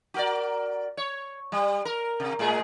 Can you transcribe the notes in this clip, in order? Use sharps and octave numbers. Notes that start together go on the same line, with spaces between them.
F#4 A#4 D5
C#5
G3
A#4
C3
A2 G#3 G#4